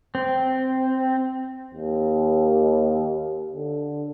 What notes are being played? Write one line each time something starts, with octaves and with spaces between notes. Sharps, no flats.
C4
D#2
D3